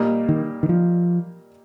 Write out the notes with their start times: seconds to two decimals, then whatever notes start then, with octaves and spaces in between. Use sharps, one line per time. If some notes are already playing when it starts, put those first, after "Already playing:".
Already playing: A#2 G3 A#3 D#4
0.29 D#3
0.63 D#3
0.69 F3